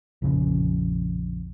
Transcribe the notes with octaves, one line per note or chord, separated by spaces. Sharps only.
A#1 F2 C#3